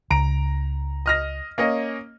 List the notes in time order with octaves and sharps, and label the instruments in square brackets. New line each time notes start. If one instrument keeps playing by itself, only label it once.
[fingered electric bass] C#2 [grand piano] A#5 D7
[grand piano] D#5 F6 A#6
A#3 C#4 D#5